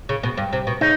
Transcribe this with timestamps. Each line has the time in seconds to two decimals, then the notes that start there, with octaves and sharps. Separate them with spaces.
0.09 C#3
0.23 B2
0.37 G2
0.53 C3
0.67 B2
0.81 C#3 D#4